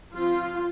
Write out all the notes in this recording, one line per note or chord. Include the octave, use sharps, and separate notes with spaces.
F3 C4 F4